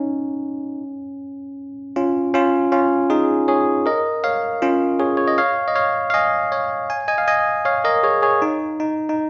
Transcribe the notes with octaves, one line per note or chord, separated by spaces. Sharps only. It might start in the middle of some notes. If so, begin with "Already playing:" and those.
Already playing: C#4 D#4
C#4 F4
C#4 F4
C#4 F4
D#4 G#4
G#4 C#5
A#4 D#5
C#5 F5
C#4 F4
G#4 C#5
C#5
D#5
C#5 F5
D#5
C#5 F5
F5
D#5 G#5
C#5 F5
G#5
D#5 G#5
F5
D#5 G#5
C#5 F5
A#4 D#5
G#4 C#5
G#4 C#5
D#4
D#4
D#4